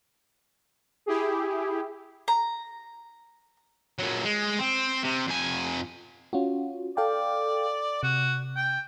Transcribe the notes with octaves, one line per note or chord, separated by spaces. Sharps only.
E4 G4 G#4
A#5
A#2 F#3
G#3
C4
C3
F2 G#5
C#4 F4 F#4
A4 D5 F5 G5
C3 F#4
G5